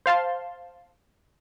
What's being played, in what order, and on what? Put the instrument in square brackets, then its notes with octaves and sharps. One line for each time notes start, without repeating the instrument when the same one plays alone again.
[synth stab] C5 F5 A5 C6